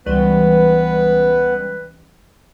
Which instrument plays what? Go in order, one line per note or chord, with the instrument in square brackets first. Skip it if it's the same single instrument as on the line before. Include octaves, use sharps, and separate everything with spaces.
[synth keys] C#2 E3 G3 [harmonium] B3 [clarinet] B4